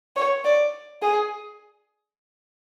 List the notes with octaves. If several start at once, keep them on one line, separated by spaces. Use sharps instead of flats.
C#5
D5
G#4